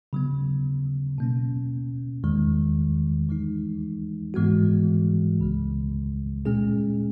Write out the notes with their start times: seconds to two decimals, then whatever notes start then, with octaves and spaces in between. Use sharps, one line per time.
0.13 C#3 F#3 B3
1.18 B2 A#3 C#4
2.24 E2 D#3 G#3
3.29 E3 G#3 D#4
4.34 G#2 E3 G#3 B3 F#4
5.39 C#2 C#3 G#3
6.45 A#2 G#3 C#4 G#4